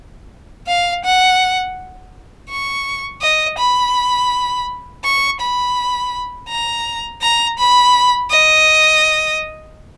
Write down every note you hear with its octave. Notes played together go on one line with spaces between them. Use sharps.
F5
F#5
C#6
D#5
B5
C#6
B5
A#5
A#5
B5
D#5